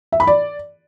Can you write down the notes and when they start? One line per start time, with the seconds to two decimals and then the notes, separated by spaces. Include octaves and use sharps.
0.12 E5
0.20 B5
0.27 D5